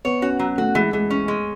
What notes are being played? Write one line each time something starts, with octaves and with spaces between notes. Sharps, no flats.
B3 C#5
C#4 F#4
F#3
A3 F#4
E3 G#3
E3 G#3
C#4
G#3